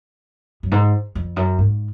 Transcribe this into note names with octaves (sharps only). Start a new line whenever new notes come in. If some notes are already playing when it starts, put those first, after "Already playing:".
F#2
G#2
F2
F#2
G#2